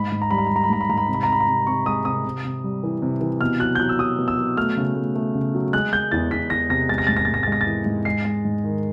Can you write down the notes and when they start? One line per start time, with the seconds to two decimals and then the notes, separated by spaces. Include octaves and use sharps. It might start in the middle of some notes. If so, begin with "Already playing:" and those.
Already playing: G#2 B5
0.12 G#2
0.22 A#5
0.30 G3 B5
0.38 A#5
0.47 B5
0.51 G3
0.56 A#5
0.63 B5
0.70 G#2 A#5
0.81 B5
0.90 G#2 A#5
0.98 B5
1.06 C3 A#5
1.14 B5
1.23 A#5
1.28 C3 B5
1.40 A#5
1.48 C3
1.67 C3 C#6
1.86 G#3 D#6
2.05 C3 D#6
2.24 C3
2.45 C3
2.64 G3
2.83 E3
3.02 C3
3.21 E3
3.41 B2 F6
3.60 F#3 F#6
3.75 G6
3.79 F#3 F#6
3.89 E6
3.99 F#3 D#6
4.18 B2
4.28 E6
4.37 F#3
4.57 A3 F6
4.77 C#3
4.96 A3
5.15 A3
5.35 C#3
5.55 F#3
5.73 G#3 F#6
5.93 G#3 G6
6.12 E2 A6
6.31 E2 B6
6.50 E2 A#6
6.70 C3 A#6
6.89 G#3 A6
6.98 A#6
7.07 G#2 A6
7.16 A#6
7.25 G#2 A6
7.34 A#6
7.43 A6
7.48 G#3 A#6
7.61 A6
7.66 E3
7.86 G#2
8.05 G#3 C7
8.25 G#3
8.45 G#2
8.64 D#3